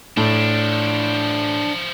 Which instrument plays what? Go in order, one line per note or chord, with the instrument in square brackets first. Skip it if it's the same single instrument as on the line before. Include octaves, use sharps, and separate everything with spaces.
[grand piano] A2 [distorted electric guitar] E3 F3 [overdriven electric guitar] D4